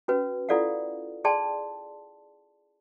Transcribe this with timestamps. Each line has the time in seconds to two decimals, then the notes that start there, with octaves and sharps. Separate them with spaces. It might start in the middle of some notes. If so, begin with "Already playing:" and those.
0.08 C#4 F#4 B4
0.49 E4 F4 A4 D5 F5 F#5
1.24 G#4 D5 G5 A5 C6